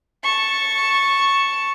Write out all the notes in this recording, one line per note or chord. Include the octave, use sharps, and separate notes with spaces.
A5 C#6